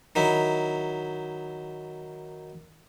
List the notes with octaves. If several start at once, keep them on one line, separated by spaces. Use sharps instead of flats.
D#3 F#3 D#4 E4